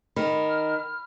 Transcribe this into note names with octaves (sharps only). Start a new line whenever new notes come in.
D#3 B5 F6